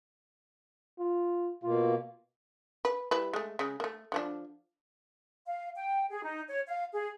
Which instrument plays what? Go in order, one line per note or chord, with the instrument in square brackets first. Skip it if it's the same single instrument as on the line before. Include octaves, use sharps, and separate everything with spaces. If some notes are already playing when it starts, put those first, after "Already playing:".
[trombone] F4
[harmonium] B2 A#3 [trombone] F4
[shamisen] B4
G3 E4 B4
G#3 A3
C#3 G#3
A3 A#3
D3 F3 D4
[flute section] F5
G5
G#4
D#4
C#5
F5
G#4